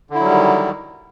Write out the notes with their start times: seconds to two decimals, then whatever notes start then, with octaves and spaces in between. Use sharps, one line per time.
0.10 D3
0.15 E4
0.20 F#3
0.25 G3
0.30 D#3